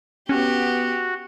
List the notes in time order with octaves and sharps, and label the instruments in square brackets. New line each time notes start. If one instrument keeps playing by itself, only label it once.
[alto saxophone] B3 [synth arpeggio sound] C#4 [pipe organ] F#4 [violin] G4